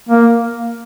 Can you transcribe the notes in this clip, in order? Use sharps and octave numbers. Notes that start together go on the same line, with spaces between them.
A#3